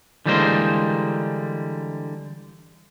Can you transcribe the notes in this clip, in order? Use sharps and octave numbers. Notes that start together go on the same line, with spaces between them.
D3 E3 G3 G#3 A#3 C5